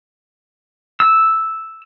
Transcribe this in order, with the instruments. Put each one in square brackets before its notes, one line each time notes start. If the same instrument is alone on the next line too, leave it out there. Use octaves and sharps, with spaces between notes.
[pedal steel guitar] E6